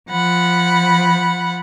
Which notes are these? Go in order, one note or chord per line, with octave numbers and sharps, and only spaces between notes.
F3 F#5 B5